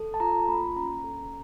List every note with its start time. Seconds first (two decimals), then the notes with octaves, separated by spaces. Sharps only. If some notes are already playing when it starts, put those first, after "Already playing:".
Already playing: A4
0.14 A5
0.20 F4 A#5
0.48 A#3 B5
0.76 C#4 A#5
1.04 A4